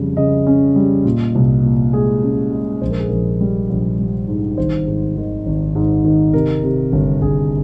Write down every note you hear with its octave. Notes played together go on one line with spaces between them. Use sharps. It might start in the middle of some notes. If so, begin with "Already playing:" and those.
Already playing: F2 C#3 G3
C#3 D#5
C#4
G3
A#2
C2
A#2
G#3 G#4
C#4
G#3
A#1 C5
A#4
G#4
A#1 A#4
G3
A#1
G3
G#2
G#1 C5
G#2
D#3
G#1
G#2
D#3
C3 A#4
C3
G1
G1 G#4